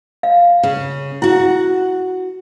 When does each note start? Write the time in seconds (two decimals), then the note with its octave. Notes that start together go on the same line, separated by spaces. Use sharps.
0.23 F5
0.63 C#3
1.22 E4 F#4 F#5